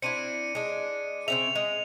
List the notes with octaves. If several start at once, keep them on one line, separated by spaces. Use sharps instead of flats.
C4 D4 E4 C#7 D#7
G#3 D4
C#3 C4 E5 F7
G#3